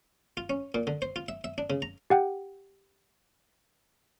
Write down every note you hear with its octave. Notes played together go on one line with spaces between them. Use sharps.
F4
C#4
A#2
D3
C5
F4
E5
E5
D4
C#3
A#5
G4 F#5 G5